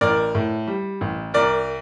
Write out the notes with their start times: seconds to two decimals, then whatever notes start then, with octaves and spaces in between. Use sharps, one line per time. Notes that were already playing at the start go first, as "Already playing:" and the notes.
0.01 A1 A#4 D5
0.35 A2
0.67 G3
1.01 A1
1.34 C2 A#4 D5